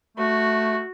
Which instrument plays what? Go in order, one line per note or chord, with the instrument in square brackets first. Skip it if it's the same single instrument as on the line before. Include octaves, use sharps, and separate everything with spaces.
[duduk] A3 [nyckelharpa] F#4